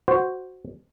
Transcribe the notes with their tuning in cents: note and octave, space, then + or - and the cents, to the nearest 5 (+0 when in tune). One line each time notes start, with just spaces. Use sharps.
F#4 +0 C5 +0